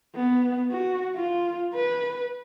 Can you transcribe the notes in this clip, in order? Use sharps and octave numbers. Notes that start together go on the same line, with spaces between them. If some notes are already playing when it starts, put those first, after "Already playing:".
B3
F#4
F4
B4